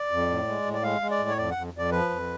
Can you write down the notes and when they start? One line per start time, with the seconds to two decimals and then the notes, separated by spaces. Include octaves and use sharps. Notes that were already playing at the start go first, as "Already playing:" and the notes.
Already playing: D5
0.11 F2
0.29 A2
0.48 G#3
0.66 A2
0.73 D5
0.83 G#3 F5
1.01 G#3
1.11 D5
1.20 A2
1.29 C#5
1.37 F2 D5
1.51 F#5
1.56 F2
1.74 F2 D5
1.92 F3 B4
2.10 F2